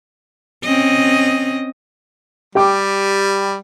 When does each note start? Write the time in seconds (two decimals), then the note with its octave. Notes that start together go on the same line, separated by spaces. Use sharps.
0.63 C4 C#4 D#5
2.55 G3 G4 G5 D6